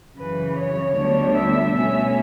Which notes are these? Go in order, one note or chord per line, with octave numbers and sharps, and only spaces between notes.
F#2 C#3 E3 B4
C#5
D2 D3 G3 B3 D4
E5
B2 A3 C#4 E5